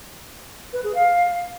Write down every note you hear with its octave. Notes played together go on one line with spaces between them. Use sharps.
B4
G#4
F5